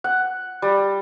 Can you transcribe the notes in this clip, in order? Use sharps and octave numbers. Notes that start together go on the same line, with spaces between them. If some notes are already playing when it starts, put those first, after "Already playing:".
F#5
G3